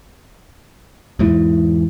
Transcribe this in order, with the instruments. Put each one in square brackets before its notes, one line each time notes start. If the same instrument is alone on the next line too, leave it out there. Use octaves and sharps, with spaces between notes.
[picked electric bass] E2 G#2 E3